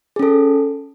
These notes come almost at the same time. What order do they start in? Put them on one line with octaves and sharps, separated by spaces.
G#4 C#4 A4